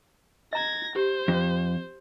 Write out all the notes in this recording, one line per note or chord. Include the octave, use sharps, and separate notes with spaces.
D#5 A#5 G#6 A#6
G4 C5
F2